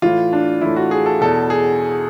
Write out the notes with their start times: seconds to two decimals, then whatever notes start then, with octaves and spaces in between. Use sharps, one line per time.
0.02 A2 E3 F4
0.33 D4
0.61 A2 E3 E4
0.76 F#4
0.91 G#4
1.06 A4
1.21 E2 B2 A4
1.50 G#4